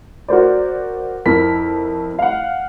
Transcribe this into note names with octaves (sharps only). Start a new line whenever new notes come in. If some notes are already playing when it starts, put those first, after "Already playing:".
F#4 A#4 C5 D5
F2 E4 A#4 B5 B6
F5 F#5